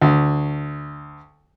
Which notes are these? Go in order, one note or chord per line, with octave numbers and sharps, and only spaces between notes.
D2